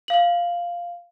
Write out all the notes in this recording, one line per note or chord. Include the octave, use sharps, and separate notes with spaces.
F5 F#7